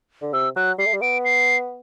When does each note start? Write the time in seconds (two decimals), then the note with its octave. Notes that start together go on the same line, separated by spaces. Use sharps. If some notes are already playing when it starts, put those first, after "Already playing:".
0.22 D3
0.33 C3 E6
0.56 F#3 F#6
0.79 G3 C7
0.86 A3
0.93 G3
1.02 B3 D7
1.25 C7